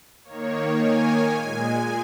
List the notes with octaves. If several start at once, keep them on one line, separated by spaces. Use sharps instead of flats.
D#3 A#3 C#5
G#5
A#2 G#3